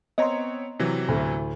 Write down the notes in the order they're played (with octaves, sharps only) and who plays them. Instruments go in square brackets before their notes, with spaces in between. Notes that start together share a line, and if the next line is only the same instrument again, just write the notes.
[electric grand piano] B3 C4 C#5 [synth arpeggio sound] D#5 A#5 C6
[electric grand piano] C3 E3 F#3
[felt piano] D2 A2